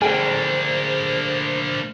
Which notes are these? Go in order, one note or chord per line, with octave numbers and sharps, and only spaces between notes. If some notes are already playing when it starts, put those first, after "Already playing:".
D2 A#3 D4 G#4 A4 C5 G5 G#5